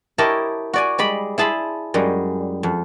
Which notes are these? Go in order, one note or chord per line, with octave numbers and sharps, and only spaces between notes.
E4 G4 A#4 C#5 D#5 A5
F#4 D5 G#5
G3 G#3 D5 B5
E4 G#4 A5 B5 C6
F#2 G3 G#3
F2